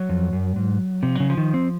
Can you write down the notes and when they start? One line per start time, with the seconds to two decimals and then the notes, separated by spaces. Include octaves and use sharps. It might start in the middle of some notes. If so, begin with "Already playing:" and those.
Already playing: F#3
0.09 F2
0.33 F#2
0.56 G#2
1.02 C3 F3
1.15 C#3 F#3
1.30 F3
1.37 D#3
1.54 C4